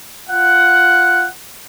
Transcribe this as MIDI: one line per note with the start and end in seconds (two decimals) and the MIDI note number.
0.28 1.27 65
0.28 1.27 78